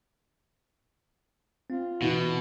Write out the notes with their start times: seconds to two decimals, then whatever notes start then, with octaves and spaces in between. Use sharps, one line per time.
1.70 C4 F4
2.02 B2 E3 F#4